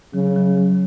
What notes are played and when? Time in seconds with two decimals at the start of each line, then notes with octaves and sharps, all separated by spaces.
0.14 C#3 F#3
0.36 F#3
0.58 F#3